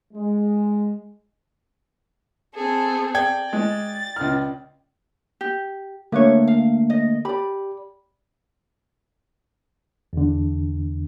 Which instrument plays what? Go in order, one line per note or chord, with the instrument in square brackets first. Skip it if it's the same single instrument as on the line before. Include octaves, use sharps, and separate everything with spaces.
[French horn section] G#3
[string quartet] C4 G#4 A4
[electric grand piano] D5 G5 G#6
[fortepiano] G#3 [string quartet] A6
[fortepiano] C#2 F6
[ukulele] G4
[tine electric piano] D3 A3 A#3 [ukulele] G4 B4 C#5
[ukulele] F5
D#5
[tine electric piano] G4 [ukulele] D5 B5
[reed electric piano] E2 D3